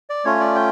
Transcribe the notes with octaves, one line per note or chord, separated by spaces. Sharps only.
D5
A3 C#4 F4 C#5
D5
G5